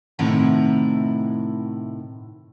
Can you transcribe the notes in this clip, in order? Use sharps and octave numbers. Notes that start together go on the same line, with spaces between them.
A2 C3 D#3 E4 F#5 A#5